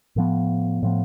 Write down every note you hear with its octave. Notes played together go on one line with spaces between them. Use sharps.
A2 F3 B3
A2 F3 B3